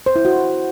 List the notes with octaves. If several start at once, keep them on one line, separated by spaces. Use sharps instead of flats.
C5
E4
F#4